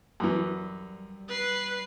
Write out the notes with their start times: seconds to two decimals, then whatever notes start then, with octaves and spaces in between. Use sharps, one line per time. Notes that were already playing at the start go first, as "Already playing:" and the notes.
0.20 F#2 E3 G3
1.29 B4 C7